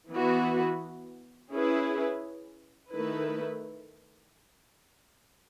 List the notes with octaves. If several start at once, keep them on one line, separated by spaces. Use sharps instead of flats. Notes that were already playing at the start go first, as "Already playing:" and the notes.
E3 B3 F#4 B4
C#4 E4 G#4 B4
D#3 A3 E4 B4